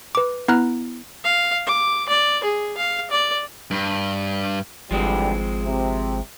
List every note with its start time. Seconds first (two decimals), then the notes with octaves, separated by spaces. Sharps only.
0.15 B4 D6
0.48 B3 E4 A#5 F6 F#6
1.24 F5
1.67 D6
2.09 D5
2.43 G#4
2.77 F5
3.10 D5
3.71 G2
4.91 G#1 D3 E3 F3 G3 G#3 C4
5.63 C3